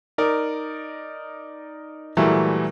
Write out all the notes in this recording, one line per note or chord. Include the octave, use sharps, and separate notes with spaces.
D#4 A#4 D5
A#2 E3 F#3 G3 A3